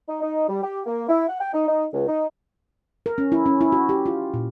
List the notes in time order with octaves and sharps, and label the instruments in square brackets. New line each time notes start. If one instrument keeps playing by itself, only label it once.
[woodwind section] D#4
D#4
G3
G4
A#3
E4
F#5
G5
D#4
D#4
C#2
D#4
[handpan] A#4
C#4
E4
C#4
E4
F#4
G4
F4
A#2